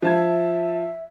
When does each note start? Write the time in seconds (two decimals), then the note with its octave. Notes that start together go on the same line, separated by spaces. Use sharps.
0.02 F3 E5 A5 G#6